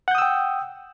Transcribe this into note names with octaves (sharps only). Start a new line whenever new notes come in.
F#5 G5 D#6 E6 G6